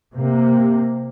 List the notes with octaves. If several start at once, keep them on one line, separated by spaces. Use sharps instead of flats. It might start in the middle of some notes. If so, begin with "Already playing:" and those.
C3 A#3